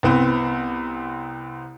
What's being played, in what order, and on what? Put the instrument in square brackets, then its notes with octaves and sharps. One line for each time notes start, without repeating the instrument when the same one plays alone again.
[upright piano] C2 B3 C4